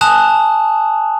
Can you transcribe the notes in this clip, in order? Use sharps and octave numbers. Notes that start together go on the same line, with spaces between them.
G#5 A5 D#6 F#6 F7